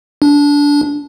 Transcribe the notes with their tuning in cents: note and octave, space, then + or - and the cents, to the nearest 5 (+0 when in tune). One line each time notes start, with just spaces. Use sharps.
D4 -20